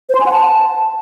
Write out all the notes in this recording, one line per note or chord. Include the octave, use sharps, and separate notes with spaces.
C5
C6
G#5
F#5
A5